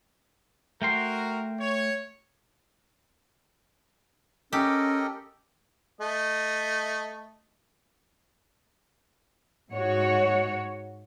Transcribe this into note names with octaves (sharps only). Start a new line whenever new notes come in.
A3 F#4 A#4 G5 C6
C#5
C#4 G4 A4 A#4 D#5
A3 D#5
G#2 F#4 C#5